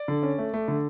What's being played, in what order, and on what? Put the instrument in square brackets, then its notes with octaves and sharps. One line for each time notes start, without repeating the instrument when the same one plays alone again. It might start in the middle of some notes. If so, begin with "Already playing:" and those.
Already playing: [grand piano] D5
D3
C#4
A3
A3
D3